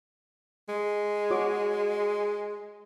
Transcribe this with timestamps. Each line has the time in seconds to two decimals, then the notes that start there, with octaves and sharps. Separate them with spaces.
0.69 G#3
1.31 F#4 C#5 D6